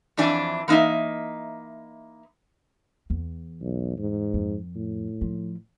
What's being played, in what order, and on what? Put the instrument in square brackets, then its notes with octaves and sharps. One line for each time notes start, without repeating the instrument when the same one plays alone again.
[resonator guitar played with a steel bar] F2 E3 D4 D5 E5 G#5
E3 A#3 D#4 D#5 E5
[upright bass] E2
[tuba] B1
G#2
[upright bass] F2
[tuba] A2
[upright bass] F3